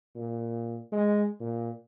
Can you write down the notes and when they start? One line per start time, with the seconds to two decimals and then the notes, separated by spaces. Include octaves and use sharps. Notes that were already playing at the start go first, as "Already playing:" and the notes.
0.15 A#2
0.92 G#3
1.40 A#2